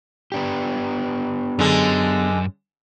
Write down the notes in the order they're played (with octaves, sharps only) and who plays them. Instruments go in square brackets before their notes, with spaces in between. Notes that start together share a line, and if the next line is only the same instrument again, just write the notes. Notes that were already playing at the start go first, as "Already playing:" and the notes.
[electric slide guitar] B3 D4 G4
[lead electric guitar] F#2 [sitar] D3 G#3